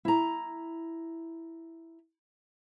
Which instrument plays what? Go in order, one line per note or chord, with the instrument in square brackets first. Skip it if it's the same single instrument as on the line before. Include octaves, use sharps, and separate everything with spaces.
[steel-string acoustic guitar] E4 A#5